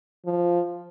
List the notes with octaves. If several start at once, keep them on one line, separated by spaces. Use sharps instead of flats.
F3